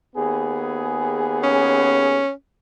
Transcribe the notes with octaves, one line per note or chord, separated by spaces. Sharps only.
D#2 B3 G#4
C#4